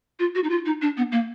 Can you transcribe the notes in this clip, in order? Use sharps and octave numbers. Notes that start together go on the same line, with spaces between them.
F4
F#4
D#4
F4
D#4
D4
B3
A#3